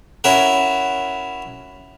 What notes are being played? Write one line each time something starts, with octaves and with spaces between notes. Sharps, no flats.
C#4 E4 F#4 A#4